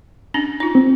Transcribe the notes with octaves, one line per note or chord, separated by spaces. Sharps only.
C#4 D4
D#4 F4
C4